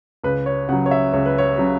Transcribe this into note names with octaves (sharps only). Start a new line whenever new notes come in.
C#2 B4
C#5
C#3 F#3 F#5
C#5
E5
C#2 C#5
B4
C#5
C#3 F#3